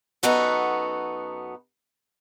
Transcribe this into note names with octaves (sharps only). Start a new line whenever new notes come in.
F#2 B3 D#4 F#4 A4